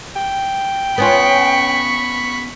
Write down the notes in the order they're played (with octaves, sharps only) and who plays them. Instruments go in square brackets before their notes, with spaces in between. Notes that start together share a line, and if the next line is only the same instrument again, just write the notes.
[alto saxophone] G5
[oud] B3 C#4 F4 [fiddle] B5 C#6